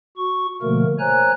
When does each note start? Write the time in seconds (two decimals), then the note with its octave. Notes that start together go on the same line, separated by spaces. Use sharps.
0.17 F#4 C#6
0.62 B2 D3 F3 A3 A#3 A#4
0.99 C5 C#5 G#5 A#5 F#6